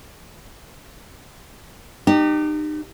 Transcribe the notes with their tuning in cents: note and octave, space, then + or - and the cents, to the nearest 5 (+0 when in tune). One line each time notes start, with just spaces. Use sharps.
D#4 -35 G4 +0